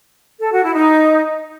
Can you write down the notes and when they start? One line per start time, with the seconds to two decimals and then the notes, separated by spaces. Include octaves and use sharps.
0.40 A4
0.52 F#4
0.64 E4
0.75 D#4